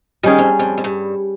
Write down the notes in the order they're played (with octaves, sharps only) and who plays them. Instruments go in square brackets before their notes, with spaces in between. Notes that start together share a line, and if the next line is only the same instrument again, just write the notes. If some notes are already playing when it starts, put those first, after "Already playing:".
[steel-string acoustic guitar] D#3 [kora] G3 C#4 G#4
[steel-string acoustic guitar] F2
F2
F2
G2